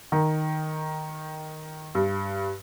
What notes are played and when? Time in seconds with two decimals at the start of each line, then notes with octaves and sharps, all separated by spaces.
0.12 D#3
1.95 G2